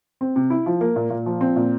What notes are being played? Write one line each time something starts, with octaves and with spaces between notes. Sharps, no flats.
C4
C3
E4
F3
A#3
A#2
A#2
F3
C4
A#2